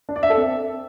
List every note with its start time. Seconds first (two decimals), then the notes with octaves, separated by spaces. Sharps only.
0.09 D4
0.16 D5
0.23 E5
0.30 A4
0.37 C4